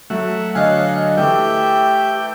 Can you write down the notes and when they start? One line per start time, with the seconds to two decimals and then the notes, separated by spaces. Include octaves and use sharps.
0.10 F#3 A3 E5 F#5
0.55 D3 F#3 C#5 D#5 F5 G#5 F#6
1.17 E3 A3 G4 E5 G5